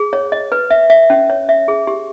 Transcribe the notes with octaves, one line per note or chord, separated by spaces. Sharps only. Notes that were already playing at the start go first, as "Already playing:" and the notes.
Already playing: G#4
C#5
D#5
B4
E5
E5
C#4
C#5
E5
G#4
G4